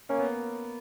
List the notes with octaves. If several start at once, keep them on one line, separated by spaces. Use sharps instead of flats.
A#3 C#4
B3